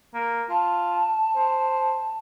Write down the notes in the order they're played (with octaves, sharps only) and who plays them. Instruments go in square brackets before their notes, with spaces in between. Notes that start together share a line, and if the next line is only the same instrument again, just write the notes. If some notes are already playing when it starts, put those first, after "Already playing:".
[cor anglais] A#3
[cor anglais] F4 [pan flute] A5
[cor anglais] C5